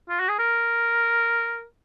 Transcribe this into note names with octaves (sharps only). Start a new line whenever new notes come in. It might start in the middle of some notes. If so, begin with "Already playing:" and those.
F4
F#4
G#4
A#4